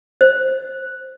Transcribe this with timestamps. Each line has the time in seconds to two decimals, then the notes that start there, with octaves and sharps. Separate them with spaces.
0.21 C5